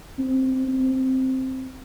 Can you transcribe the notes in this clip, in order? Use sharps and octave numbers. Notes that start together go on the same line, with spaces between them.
C4
C4